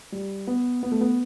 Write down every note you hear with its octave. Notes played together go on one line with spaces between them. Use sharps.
G3
B3
B3
A3
B3